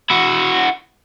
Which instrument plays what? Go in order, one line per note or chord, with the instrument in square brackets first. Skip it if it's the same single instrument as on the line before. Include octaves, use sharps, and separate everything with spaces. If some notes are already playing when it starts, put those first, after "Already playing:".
[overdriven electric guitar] E4 F#4